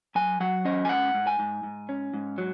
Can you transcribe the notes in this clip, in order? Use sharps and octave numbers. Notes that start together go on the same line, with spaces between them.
F#3 G#5
F#3 F#5
C#4 D#5
G#5
G#2 F#5
G#2
G#5
G#2
G#2
C#4
G#2
F#3